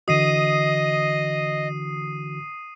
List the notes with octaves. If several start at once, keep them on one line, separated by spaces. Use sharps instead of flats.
D3 E3 F#4 D#5 D#6 C7 D#7